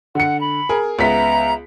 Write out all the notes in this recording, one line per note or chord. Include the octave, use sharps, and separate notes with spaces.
D3 F#5 C#7
B5
G#4 A#4
C#2 B3 E5 A#5 B6